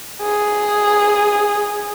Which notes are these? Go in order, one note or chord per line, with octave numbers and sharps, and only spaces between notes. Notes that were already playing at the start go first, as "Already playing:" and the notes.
G#4